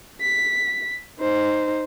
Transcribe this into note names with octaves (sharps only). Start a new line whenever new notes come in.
B6
D#4 C5